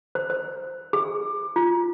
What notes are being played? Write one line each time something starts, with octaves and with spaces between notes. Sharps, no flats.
C5
C5
G#4
F4